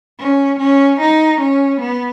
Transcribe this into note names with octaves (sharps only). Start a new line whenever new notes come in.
C#4
C#4
D#4
C#4
B3